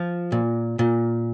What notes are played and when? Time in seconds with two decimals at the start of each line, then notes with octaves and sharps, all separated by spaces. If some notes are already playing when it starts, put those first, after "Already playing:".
Already playing: F3
0.32 A#2
0.79 A#2